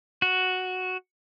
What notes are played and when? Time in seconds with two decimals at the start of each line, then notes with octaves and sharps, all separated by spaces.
0.22 F#4